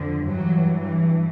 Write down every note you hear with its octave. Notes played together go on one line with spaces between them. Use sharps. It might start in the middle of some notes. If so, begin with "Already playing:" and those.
Already playing: F2 D3 F3
G2 E3 F#3